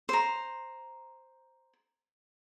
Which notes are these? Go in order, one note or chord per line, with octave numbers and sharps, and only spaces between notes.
C5 A#5